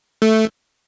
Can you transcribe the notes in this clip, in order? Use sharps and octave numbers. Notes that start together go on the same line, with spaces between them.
A3